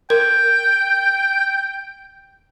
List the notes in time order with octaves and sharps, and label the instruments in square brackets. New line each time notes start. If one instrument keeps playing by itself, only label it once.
[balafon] A#4 [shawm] G5